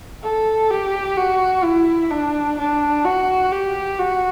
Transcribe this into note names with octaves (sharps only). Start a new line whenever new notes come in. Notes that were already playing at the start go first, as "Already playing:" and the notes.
A4
G4
F#4
E4
D4
D4
F#4
G4
F#4